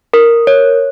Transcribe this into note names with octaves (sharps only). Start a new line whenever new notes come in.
A#4
C#5